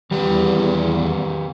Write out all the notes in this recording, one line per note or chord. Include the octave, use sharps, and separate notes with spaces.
E2 D#3 G3 G4 B4